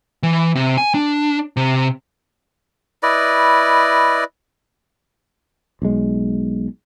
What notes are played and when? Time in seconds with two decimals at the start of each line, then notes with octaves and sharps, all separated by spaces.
0.23 E3
0.55 C3
0.77 G#5
0.95 D4
1.57 C3
3.03 E4 B4 D5 D#5
5.82 B1 G#3